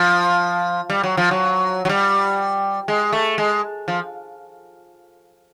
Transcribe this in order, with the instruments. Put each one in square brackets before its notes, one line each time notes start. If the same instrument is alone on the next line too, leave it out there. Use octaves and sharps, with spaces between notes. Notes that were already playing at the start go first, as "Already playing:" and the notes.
Already playing: [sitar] F3
G3
F#3
F3
F#3
F#3
G3
G#3
A3
G#3
F3